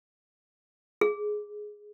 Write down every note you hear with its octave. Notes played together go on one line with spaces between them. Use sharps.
G#4